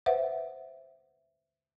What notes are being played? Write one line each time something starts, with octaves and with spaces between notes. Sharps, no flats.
B4 C5 E5 F#5